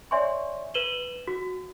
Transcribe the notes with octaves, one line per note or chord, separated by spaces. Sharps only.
C#5 D5 E5 G#5 C6 C#6
B4 D#7 E7 F#7 G7
F#4